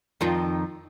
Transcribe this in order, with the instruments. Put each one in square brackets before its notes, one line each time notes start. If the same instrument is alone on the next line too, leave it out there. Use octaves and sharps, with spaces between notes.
[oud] F2 D#3 F4